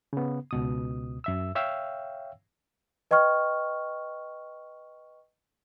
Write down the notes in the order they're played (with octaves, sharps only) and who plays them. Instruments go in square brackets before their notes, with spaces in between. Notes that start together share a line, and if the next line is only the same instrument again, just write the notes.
[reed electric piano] C#3 B3
C#2 B2 D#6
F#2 E5 E6
C#5 E5 F5 G5 E6
[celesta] B4 D#5 G5 C#6 F6